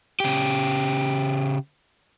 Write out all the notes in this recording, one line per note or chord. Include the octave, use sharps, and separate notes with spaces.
C#3 G4